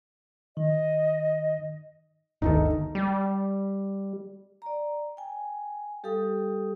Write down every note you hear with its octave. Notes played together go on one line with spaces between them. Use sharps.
D#3 D#5
G1 D2 D#3 D#4 A4
G3
D5 A#5
G5 G#5
G3 G4 A4 F5 G5 D#6